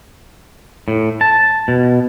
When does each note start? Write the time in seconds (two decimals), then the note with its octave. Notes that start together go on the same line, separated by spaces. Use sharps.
0.88 A2
1.21 A5
1.68 B2